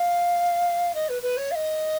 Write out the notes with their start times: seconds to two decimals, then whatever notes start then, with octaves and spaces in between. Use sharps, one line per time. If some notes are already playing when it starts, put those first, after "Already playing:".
Already playing: F5
0.94 D#5
1.09 B4
1.22 B4
1.37 C#5
1.51 F5
1.55 D#5